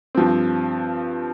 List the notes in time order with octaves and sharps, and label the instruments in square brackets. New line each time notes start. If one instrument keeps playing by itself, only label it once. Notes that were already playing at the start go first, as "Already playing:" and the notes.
[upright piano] G2 F3 C4